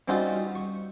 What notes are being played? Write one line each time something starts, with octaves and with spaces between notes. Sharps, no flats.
G3 C4 C#4 D#4 F4 F#4
C#6